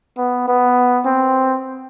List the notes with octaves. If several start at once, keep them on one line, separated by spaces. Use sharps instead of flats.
B3
B3
C4